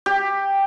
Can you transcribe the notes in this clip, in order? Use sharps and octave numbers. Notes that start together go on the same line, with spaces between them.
G4